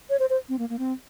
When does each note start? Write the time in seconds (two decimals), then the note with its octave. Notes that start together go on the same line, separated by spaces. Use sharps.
0.10 C#5
0.20 C5
0.30 C5
0.49 C4
0.59 A#3
0.69 A#3
0.79 C4